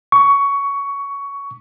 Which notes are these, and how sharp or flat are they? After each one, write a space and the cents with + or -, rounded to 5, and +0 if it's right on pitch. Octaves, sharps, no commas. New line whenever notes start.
C#6 +15